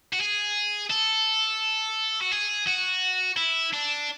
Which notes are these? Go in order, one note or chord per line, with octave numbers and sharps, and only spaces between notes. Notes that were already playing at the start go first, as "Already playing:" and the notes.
F#4
G#4
A4
F#4
G#4
F#4
E4
D4